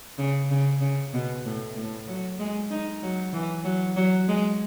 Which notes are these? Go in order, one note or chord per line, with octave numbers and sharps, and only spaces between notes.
C#3
C#3
C#3
B2
A2
A2
F#3
G#3
D#4
F#3
E3
F#3
F#3
G#3